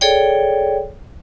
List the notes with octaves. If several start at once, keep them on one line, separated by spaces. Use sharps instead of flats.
G#4 A4 C#5 D5 G5